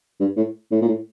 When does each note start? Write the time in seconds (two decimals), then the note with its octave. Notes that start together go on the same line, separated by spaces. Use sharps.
0.20 G2
0.37 A2
0.72 A2
0.82 A#2
0.88 A2